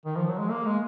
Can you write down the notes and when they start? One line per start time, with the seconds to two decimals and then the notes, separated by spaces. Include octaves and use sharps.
0.06 D#3
0.16 F3
0.27 F#3
0.38 G#3
0.50 A#3
0.65 G#3